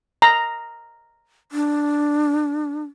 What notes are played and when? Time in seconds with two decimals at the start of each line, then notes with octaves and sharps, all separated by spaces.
0.22 A#5
1.52 D4